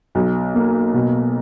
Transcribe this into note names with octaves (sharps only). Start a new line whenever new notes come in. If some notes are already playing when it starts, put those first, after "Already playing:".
B1
A#3
B2